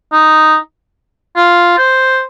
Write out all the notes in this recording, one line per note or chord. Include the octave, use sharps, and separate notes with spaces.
D#4
F4
C5